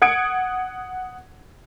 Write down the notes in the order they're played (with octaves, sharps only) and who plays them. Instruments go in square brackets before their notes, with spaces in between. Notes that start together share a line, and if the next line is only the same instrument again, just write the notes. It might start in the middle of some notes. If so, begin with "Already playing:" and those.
[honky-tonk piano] F#5 D#6 G#6 C#7 D7